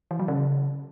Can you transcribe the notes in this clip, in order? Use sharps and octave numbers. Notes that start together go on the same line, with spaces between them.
E3
F#3
C#3